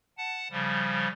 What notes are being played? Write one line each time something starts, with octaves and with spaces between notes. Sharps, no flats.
F#5 A5
C#3 F3 G3